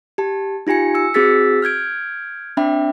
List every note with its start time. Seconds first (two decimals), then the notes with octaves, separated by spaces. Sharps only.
0.18 G4 A5
0.67 D#4 F4 G4 G#5 C#7
0.95 E6 C#7
1.14 C4 F#4 G#4 E6 A6 B6
1.62 F6 G6 G#6 D7
2.57 C4 D4 E5 G5 B5